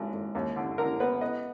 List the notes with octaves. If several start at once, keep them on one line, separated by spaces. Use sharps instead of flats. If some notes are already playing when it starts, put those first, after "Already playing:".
Already playing: G#1
G#1
D#2
D3
D3 A#4
B3 B4
B3 D#5